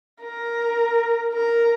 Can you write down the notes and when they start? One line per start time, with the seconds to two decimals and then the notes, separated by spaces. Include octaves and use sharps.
0.22 A#4
1.33 A#4